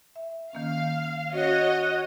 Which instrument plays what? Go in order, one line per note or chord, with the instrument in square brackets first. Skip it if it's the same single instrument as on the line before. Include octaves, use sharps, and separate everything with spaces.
[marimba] E5
[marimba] D#3 A#3 C#4 [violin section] F5
[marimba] C#4 [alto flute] F#4 [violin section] C#5 D#5